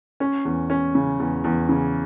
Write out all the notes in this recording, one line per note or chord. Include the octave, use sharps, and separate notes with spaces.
C#4
E2
C#4
C#3
E2
E2
C#3